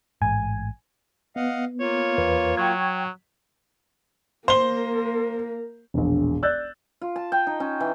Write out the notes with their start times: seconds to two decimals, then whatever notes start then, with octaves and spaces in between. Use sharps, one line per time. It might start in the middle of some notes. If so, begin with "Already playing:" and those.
0.22 A1 G#2 G#5
1.36 B3 D#5 F5 F#5
1.80 A#3 F4 C#5
2.18 E2 B4
2.57 F#3 G5 C#6 G#6
4.48 A#3 A#4 C5 G7
5.94 E1 A#1
6.43 D5 E6 F#6 G6 A6
7.01 F4
7.16 A5
7.32 G5
7.47 D#4
7.60 C#4
7.80 E3